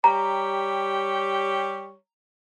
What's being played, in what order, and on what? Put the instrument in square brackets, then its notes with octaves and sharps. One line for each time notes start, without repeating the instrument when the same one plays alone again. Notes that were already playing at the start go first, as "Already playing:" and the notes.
[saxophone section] G3 G4 C#5 [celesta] A#5